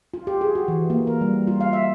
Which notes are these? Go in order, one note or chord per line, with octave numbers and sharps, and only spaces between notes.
F4
G4
G#4
F#4
E3
A#3
A#4
G3
F4
F5
E5